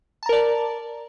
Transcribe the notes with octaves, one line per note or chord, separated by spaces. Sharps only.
A#4 D5 A5 A#5